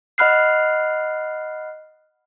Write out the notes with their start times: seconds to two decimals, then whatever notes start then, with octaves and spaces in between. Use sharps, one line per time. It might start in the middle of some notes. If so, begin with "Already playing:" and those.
0.18 D#5 F#5 B5 F6 F#6 C7